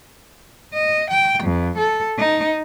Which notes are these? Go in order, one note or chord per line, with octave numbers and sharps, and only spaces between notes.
D#5
G5
F2
A4
D#4